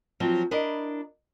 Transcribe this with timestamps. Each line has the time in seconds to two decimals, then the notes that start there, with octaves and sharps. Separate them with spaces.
0.20 F3 F#3 C4
0.51 D4 E4 A#4 D#5